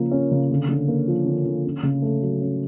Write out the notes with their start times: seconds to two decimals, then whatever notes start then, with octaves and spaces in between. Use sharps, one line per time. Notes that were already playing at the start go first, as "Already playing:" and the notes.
Already playing: C#3 F3 A#3 C#4
0.11 C#4
0.31 C#3
0.50 D3
0.69 D3
0.88 A#3
1.08 F3
1.26 D3
1.46 D3
1.64 C#4
1.83 C#3
2.02 A3
2.22 F#3
2.41 C#4